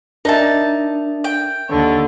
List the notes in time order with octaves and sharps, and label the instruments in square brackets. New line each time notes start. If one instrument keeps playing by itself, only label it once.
[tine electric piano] D4 [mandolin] D#4 A5 [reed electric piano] A#4 E5
[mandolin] G5
[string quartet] D#2 D3 C#5